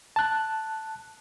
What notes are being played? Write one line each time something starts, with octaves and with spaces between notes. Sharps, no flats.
A5 F#6